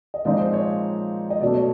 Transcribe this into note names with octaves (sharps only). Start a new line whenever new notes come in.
D#5
A#2 F3 G#3 C4 D#4 D5
C5
C#5
D#5
B2 F#3 A3 D5
C#5